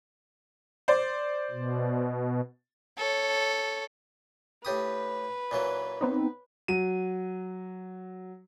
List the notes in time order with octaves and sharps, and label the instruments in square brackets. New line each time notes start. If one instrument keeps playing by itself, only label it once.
[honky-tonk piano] C5 D5
[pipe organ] B2
[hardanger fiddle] A4 C#5
[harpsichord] A2 G4 D#6 [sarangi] B4
[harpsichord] A#2 E3 F#3
[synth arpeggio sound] B3 C4 D#4
[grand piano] F#3 D#7